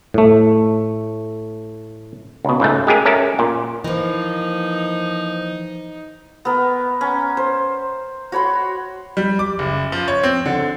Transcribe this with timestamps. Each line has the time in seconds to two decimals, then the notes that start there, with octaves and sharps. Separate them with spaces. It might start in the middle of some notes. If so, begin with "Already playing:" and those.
0.14 A2 A3
2.45 C#2 B2
2.60 C#2 G#2 A3
2.87 G#3 G4 G#4 A#4
3.05 C#4 A4 A#4 E5 A5
3.39 A#2
3.84 E3 F3 A#3 D#4
6.45 B3 A#4
7.01 C#4
7.37 C5
8.32 F#4 C#5 B5 C6
9.17 G3
9.39 D6
9.59 F#1
9.92 F3
10.08 C#5
10.23 C4
10.46 D3